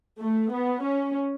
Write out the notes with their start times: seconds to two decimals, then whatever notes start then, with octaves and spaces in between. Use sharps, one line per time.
0.20 A3
0.52 B3
0.84 C#4